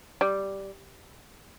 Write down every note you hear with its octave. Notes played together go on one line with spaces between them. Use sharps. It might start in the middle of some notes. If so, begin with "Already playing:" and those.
G3